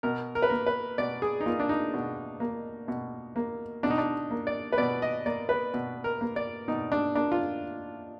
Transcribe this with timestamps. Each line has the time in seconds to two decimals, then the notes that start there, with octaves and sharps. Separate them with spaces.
0.03 B2 A#4
0.35 A#4
0.42 B4
0.49 A#3 A#4
0.66 B4
0.98 B2 D5
1.22 G#4
1.41 D#4
1.46 A#3 F4
1.60 D4
1.69 D#4
1.94 B2
2.40 A#3
2.88 B2
3.36 A#3
3.83 B2 D4
3.90 D#4
3.98 D4
4.31 A#3
4.47 D5
4.73 B4
4.78 B2 D5
5.02 D#5
5.26 A#3 D5
5.49 B4
5.74 B2
6.04 A#4
6.21 A#3
6.36 D5
6.68 B2 D#4
6.92 D4
7.15 A#3 D4
7.32 F4